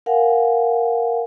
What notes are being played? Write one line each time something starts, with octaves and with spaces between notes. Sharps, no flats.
A#4 F5 F#5 G#5